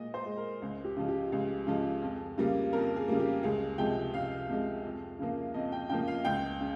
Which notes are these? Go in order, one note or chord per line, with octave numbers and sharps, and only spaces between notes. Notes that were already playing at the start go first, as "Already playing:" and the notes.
Already playing: A#2 G#3 D#5
C5
G#3
A#4
C#2
G4
C#3 F3 G#3
G4
C#2 G#4
C#3 F3 G#3
F2
C#3 G3 A#3
F2 A#4
G#4
C#3 G3 A#3
G4
C#2 G#4
C3 F3 G#3 G5
C#2 F5
C3 F3 G#3
F2
C#3 F3 A#3
F2 D#5
G5
C#3 F3 A#3 G5
F5
C#2 G5
C#3